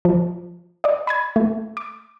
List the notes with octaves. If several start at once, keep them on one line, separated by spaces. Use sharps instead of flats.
F3
D5 D#5
B5 D#6 G#6
A3
D6